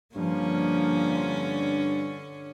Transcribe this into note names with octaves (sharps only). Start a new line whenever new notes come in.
G2 D3 F3 A#3 C#4